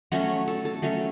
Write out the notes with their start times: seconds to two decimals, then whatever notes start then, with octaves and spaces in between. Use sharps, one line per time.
0.12 F#3 A3 C#4 F#4
0.48 A4
0.65 A4
0.82 F#3 A3 C#4